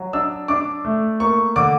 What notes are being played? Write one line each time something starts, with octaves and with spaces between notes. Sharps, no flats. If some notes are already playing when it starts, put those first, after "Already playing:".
Already playing: F#3
D4 E6
D4 D6
A3
A#3 C#6
D3 D6